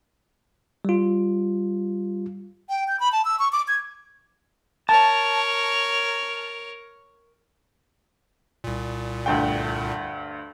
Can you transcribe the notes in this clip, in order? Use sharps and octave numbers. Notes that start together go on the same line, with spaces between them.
G3 F4
G5
G6
B5
A5
E6
C#6
D6
G#6
A#4 C#5 A5
C2 A#2
D2 G2 G5